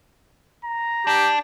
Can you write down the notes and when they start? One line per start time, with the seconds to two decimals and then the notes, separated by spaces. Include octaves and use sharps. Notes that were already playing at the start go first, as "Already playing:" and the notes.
0.64 A#5
1.07 D4 G4